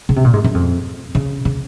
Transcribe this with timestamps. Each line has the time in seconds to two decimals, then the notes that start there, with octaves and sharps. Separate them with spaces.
0.09 C#3
0.16 C3
0.24 A#2
0.33 G#2
0.44 F#2
0.54 F2
1.15 C#3
1.45 C#3